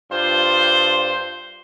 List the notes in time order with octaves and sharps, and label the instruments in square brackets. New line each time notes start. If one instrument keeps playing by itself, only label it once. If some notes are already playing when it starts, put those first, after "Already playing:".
[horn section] G2 F4 C5